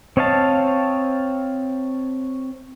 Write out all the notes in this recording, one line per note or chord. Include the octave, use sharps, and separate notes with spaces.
C4 C#5 D#5 F5 A5